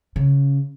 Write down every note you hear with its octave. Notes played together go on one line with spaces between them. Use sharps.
C#3